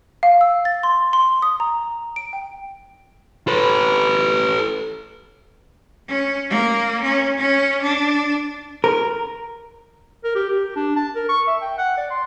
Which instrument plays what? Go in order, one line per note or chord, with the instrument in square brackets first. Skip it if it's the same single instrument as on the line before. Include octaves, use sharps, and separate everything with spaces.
[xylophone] F5
E6
A6
C6
C6
D#6
A#5
D7
G5
[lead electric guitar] A4 B4
[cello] C#4
A#3
C#4
C#4
D4
[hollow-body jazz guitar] A#4
[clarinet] A#4
G4
G4
D4
A5
A#4
C#6
E5
G5
F#5
D5
C6